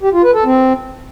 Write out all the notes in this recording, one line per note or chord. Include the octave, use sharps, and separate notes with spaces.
G4
F4
B4
A4
C4